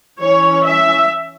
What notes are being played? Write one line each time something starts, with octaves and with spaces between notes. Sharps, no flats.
E3 C#4 C#5
E5